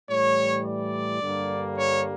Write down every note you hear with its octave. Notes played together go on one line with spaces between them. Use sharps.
A2 E3 G3 C#5
D5
G2 D3 G3 A#3
C#5